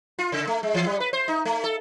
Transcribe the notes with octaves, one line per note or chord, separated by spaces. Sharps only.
F4
C#3
A3
G#3
E3
G3
B4
C5
D#4
A3
A4